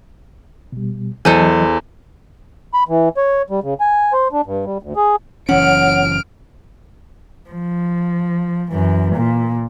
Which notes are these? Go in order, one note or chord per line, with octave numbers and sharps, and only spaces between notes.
B2 G3
E2 E3 F#3 A4 C5 D#5 G#5
B5
E3
C#5
G3
C#3
G#5
C5
D4
G2
G3
D2
G#4
F#1 E3 C#4 C#5 F#5 F6 D7
F3
F#2 E3
A#2